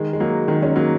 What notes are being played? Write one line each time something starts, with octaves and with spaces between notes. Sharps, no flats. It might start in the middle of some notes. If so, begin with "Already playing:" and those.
Already playing: D#3 G#3
G#3
F#3 A#3
D#3 G#3
G#3 C#4
F#3 A#3